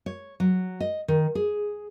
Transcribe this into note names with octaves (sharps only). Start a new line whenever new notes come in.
C#5
F#3
D#5
D#3
G#4